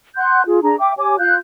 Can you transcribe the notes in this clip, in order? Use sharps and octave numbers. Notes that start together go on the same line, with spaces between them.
F#5 C6 F#6 G6
F4 G#4
D4 G#4 A#5
E5 G5 D6
G4 C#5 G#5 D6
F4 F5 F#6 G6